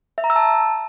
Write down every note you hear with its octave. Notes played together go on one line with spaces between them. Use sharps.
E5
A#5
E6
A5